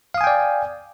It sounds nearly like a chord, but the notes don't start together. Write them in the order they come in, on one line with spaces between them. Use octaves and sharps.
F5 D#6 G#5 G5 D5